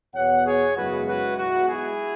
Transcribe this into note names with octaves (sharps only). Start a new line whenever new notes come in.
E2 B2 B3 C#5 F#5
G#4 C#5
F#2 C#3 G#3 B3 E4 F#4 B4
F#4 B4
B1 B2 G#3 E4 F#4
E4 G#4